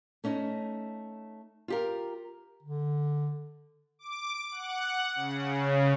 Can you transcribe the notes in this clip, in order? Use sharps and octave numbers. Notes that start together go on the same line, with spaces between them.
A3 C#4 D#4
F4 G4 A#4
D3
D6
F#5
C#3